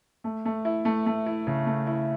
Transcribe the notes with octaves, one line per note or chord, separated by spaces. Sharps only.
A3
A3
E4
A3
A3
E4
C#3
A3
E4